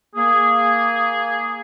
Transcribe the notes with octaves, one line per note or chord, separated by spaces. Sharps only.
A#3 G#4